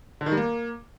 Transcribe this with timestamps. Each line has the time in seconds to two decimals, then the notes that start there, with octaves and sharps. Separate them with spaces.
0.21 D3
0.26 D#3
0.32 G3
0.37 A#3